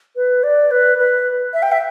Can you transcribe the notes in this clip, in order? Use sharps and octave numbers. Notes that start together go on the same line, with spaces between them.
B4
D5
B4
B4
E5
G5
E5